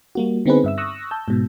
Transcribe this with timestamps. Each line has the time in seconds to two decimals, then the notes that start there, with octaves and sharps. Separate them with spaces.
0.15 G3 A#3 F#4
0.46 D3 B3 C4 D#4 G#4 B4
0.64 G2 E5 E6
0.78 C#6 D#6 E6 F#6 A#6
1.11 A5 E6 G6
1.28 G#2 B2